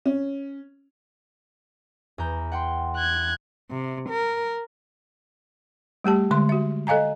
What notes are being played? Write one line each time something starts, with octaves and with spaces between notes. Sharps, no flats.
C#4
E2 A#5 G6
F#5 G5 C6
F#6 G#6
C3
A#4
G3 A3 G4 A5
D3 G#3 C6
F#4 E5
A4 D#5 F5 G#5 A#5